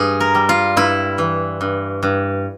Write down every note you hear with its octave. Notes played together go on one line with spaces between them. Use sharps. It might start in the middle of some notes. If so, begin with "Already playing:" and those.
Already playing: G2 G#4
A#4
G3
F4
G2 E4
E3
G2
G2